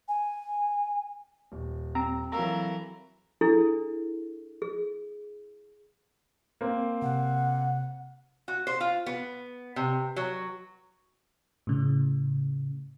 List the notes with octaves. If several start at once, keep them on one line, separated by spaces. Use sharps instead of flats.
G#5
D#1
C4 A#5
E3 F#3 A4 A#4 F5 A#5 E6
D4 E4 G#4 A4
G#4
A#3 C4
C3 F#5
F#4
C5
F4
B3
C3
F#3
A2 C#3